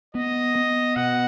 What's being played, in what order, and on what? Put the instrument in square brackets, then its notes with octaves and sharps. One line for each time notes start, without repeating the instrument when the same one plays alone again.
[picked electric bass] B3 [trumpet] D#5
[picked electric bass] B3
[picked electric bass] B2 [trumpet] F#5